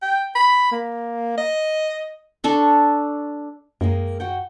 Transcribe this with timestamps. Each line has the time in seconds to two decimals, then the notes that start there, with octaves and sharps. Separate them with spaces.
0.02 G5
0.35 B5
0.72 A#3
1.38 D#5
2.44 D4 A4 C#6
3.81 F#2 D#3 G#3 A#3
4.20 F#4 F#5 G5